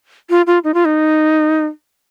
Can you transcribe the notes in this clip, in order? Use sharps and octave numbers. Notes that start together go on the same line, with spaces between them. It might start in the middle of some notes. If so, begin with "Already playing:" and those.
F4
F4
D#4
F4
D#4